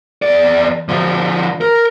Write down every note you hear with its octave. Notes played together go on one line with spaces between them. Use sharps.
E2 D5
D3 F3
A#4